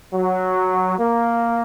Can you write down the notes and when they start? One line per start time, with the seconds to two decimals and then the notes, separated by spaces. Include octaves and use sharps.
0.13 F#3
0.98 A#3